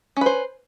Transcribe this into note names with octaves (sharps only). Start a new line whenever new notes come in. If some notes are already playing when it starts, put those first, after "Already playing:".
C#4 B4 C5